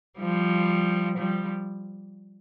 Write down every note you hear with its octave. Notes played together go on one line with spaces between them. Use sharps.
F3 G3
F3 G3